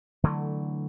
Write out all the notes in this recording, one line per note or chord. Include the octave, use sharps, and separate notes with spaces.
D3 E3 F#3 A3